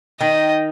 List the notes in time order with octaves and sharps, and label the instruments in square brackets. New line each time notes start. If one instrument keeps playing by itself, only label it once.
[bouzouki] D#3 [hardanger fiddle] D#5